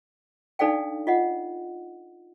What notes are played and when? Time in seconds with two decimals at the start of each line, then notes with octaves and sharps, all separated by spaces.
0.59 D4 D#4 A4 D5 F5 G5
1.07 F4 D#5 F#5